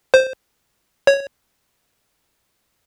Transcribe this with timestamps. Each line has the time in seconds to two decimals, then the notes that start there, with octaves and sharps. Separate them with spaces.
0.14 C5
1.07 C#5